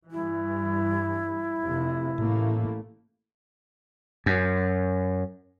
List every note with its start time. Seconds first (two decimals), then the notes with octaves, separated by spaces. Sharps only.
0.11 G2 E3 E4
1.62 F1 C3
2.18 A1 A2 A3 A#3
4.26 F#2